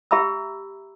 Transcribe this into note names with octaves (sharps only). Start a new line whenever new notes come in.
G4 E5 A#5 B5 E6